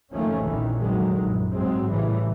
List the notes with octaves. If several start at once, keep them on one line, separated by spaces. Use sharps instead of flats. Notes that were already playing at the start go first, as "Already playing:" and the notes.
F#1 D#2 D#3 F3 A3 C#4
F1 A#1 E2 D#3 E3
F1 D3 D#3 F#3 G#3
A#1 F#2
G#2 F#3 G#3 C4
A1 A2 C#3 E3 G3